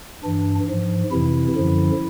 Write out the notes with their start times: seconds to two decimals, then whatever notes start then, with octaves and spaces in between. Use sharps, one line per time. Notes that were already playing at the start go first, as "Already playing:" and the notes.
0.24 G2 E3 D4
0.68 G#2 F3
1.12 F2 C3 E3 E4
1.56 F#2 D3 F3